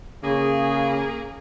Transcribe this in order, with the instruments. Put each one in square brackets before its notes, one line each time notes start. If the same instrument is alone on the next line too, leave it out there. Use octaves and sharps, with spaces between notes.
[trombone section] C#3 [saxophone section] A#3 G#4